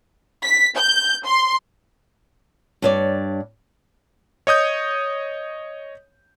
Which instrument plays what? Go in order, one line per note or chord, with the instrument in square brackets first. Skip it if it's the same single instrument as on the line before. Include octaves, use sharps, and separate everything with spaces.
[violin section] B6
G6
C6
[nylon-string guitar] G2 C#5 D5
[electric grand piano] C#5 D#5 D#6 G6